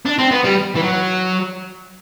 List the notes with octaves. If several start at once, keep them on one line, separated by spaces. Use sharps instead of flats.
D4
C4
B3
G3
E3
F#3